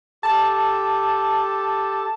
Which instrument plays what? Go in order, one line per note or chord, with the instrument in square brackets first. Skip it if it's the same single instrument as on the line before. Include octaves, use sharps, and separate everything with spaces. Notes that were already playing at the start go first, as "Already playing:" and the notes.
[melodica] G4 A4 [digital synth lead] A5